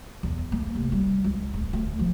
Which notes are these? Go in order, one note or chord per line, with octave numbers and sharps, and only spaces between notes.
E2
A#3
F1
G3
C#2
D1
D2
F3